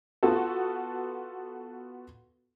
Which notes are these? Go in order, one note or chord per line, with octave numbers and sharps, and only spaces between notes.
B3 F4 F#4 A4